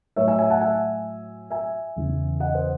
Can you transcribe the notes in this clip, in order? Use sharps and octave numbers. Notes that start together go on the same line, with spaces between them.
A2 F#3 C#5 E5
E5 G#5
E5 G#5
F#5 A5
E5 G#5
E5 G#5
E2 C#3 E3
D#5 F#5
C5